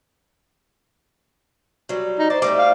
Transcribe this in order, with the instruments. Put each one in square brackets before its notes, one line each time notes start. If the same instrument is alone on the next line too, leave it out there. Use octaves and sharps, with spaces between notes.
[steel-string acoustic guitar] F#3 G3
[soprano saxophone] D#4
[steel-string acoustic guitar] C5 [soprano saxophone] D5
[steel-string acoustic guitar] G3 A3 C4 [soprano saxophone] D6
[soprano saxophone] F5